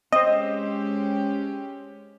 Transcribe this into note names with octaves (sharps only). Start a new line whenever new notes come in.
G#3 C4 C#4 G4 C5 D#5